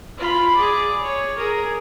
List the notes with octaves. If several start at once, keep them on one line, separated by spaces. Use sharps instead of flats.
F4 B5
G#4 D5
C#5
G#4 A#4